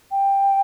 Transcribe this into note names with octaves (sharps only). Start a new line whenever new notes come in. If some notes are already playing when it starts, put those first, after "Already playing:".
G5